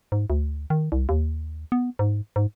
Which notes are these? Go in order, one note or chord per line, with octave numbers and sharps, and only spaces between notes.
G#2
D2
D#3
C2
D#2
B3
G#2
G#2